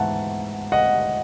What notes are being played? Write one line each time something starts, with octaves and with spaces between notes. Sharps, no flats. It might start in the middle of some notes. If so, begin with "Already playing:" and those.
Already playing: G#2 E3 B3 E5 F#5 A5
D#5 F#5